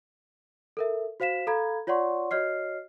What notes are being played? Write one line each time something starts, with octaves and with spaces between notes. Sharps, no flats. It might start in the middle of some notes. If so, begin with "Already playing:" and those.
A4 A#4 E5
F#4 C5 F5 B6 E7
A4 F5 A#5 B5 G#6
F4 C#5 D5 F#5 C6 C#6
F#4 C#5 D#5 F6 C7